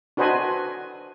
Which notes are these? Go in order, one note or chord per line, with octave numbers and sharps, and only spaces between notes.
D4 F#4 B4 C5 D#5 G#5